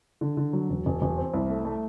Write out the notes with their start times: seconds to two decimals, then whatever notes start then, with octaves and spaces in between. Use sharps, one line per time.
0.21 D3
0.37 D3
0.53 F#3
0.70 E1
0.86 E1
1.02 E1
1.18 C4
1.34 C2
1.50 A3
1.65 A3